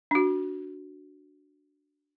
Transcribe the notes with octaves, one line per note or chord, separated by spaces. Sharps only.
D4 F#4